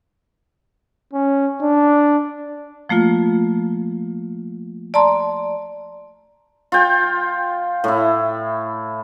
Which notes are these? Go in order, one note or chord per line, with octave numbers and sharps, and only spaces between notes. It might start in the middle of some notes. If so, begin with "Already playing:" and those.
C#4
D4
F3 A3 A#3 F4
D5 A5 A#5 C6
F4 G5
A2 E4